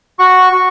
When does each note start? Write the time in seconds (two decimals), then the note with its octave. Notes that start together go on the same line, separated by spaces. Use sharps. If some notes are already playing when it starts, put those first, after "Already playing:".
0.19 F#4 C#6
0.53 F#4